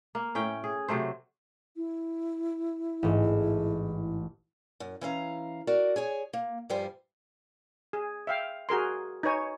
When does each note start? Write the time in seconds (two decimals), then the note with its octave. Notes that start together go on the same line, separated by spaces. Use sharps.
0.15 A#3
0.35 A2 C#4 G5
0.64 G#4
0.88 C3 F#3 A3 C5
1.76 E4
3.03 A1 G#2
4.80 F#2
5.01 E3 C#4 F5 A#5
5.67 F#4 A#4 D5
5.96 G#4 C#5 G#5
6.33 A#3
6.70 G2 F3 G3 G4 C5 G#5
7.93 G#4
8.27 E5 F5 G5
8.69 F#4 G#4 A#4 C6
9.23 D#4 B4 C#5 G#5